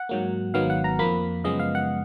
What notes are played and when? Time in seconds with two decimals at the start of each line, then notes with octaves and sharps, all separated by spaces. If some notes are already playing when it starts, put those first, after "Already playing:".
Already playing: F#5
0.09 G#2 F#3 A#3
0.54 G#1 G#2 D#3 F#3 B3 F5
0.70 F#5
0.84 A#5
0.99 F2 F3 A#3 B5
1.44 F#2 C#3 F3 G#3 B3 D#5
1.59 F5
1.75 F#5